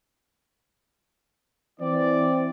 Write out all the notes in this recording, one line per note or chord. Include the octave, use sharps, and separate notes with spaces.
E3 C4 D5